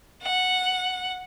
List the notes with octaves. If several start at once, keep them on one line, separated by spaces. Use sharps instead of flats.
F#5